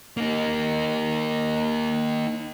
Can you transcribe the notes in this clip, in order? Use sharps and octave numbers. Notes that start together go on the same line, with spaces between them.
A#3 D#4